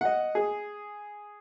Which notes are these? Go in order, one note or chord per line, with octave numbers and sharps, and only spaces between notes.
D#5 F#5
G#4